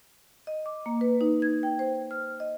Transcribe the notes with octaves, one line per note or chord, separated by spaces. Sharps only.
D#5
D6
A#3
B4
D#4
G#6
G5
C5
F6
D#5